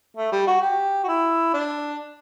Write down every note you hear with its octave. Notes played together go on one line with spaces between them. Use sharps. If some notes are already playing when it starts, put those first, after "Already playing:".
A3
G3
F#4
G4
F#4
E4
D4